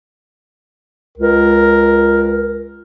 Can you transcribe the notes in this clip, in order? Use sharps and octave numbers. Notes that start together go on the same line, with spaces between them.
C#2 A#4